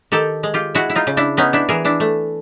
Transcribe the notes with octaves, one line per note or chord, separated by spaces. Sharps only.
D#3 G4 A4
G#3
F4 G4
G#3 E4 F#4
E4
D#4 F4
C#3
D4 E4
B3 C#4 D#4
D4 E4
E3 G#4 A#4
D4 E4
A3